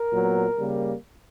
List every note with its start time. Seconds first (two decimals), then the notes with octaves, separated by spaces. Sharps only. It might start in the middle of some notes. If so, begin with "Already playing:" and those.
Already playing: A#4
0.12 A#2 F#3 B3
0.58 C#3 G3 A#3